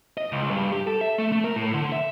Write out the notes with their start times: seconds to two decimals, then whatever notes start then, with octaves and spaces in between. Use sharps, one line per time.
0.18 D#5
0.32 C#2
0.51 G2
0.73 G4
0.87 A4
1.01 E5
1.18 A3
1.32 A3
1.44 A#4
1.56 A2
1.74 D3
1.92 E5